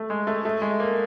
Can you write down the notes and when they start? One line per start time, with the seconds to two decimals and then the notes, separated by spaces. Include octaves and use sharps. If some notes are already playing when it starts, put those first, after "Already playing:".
Already playing: A3
0.10 G#3
0.27 A3
0.45 A3
0.62 G#3
0.80 A#3